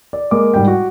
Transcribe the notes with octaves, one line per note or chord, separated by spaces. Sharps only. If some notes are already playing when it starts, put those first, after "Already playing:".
D5
G#3 A#3 D6
G#2 G3 G5
F#4